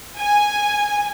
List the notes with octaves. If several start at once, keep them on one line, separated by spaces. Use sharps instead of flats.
G#5